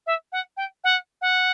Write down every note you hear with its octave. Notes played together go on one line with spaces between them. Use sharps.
E5
F#5
G5
F#5
F#5